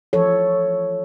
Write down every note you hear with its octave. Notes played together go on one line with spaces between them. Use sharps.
E3 F3 A4 C#5